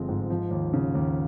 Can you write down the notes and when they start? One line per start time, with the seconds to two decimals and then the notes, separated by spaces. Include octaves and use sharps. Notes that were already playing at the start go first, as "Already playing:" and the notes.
Already playing: G1 F3 G#3 C4
0.09 G#2
0.30 F3
0.51 D#2
0.73 C#3
0.95 D#2